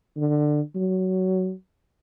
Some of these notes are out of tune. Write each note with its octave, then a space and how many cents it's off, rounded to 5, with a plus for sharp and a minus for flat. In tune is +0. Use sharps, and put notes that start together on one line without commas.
D3 +20
F#3 +15